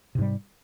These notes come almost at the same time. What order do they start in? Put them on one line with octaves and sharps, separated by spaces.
C3 G#2 G3